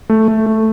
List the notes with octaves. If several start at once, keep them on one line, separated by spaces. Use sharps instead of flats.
A3
A3
A3